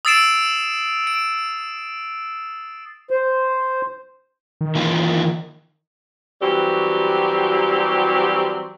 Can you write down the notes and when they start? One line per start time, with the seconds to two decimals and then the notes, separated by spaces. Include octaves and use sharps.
0.05 D#6 E6 A6 C7 D7 E7
1.07 D7
3.11 C5
4.61 D#3
4.75 E3 A#3 F4
6.41 E3 F#3 G3 C4 F#4 G4